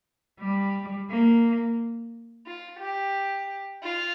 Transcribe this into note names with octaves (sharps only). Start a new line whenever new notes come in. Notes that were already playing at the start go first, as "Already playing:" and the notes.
G3
A#3
F4
G4
F4